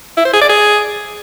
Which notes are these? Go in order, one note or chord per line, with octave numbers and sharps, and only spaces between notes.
E4
C5
G#4
D5
G#4